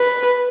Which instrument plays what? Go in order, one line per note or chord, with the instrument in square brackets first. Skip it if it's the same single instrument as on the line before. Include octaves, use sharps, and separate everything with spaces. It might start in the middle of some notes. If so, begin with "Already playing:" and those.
Already playing: [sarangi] B4